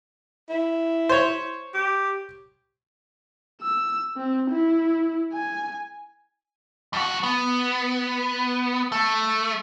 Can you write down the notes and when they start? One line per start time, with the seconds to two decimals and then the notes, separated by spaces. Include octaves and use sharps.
0.49 E4
1.09 C5 C#5
1.74 G4
3.62 E6
4.17 C4
4.51 E4
5.33 G#5
6.93 F2 F#4
7.23 B3
8.92 A3